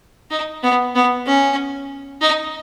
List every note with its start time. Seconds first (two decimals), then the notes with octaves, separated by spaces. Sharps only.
0.31 D#4
0.63 B3
0.95 B3
1.26 C#4
2.21 D#4